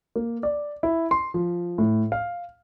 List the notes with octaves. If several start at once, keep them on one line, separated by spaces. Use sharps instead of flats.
A#3
D5
E4
C6
F3
A2
F5